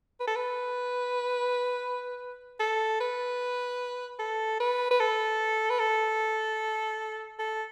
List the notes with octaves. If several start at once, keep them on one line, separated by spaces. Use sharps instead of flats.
B4
A4
B4
A4
B4
A4
B4
B4
A4
B4
A4
A4